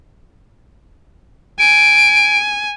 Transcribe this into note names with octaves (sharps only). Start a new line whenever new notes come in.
G#5 D7